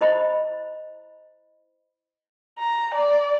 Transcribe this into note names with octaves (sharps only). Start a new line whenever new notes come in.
E4 C5 D#5 B5
A#5
D5